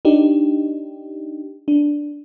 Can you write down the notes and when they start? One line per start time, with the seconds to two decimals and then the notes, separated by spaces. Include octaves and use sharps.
0.05 D4 D#4 G4
1.68 D4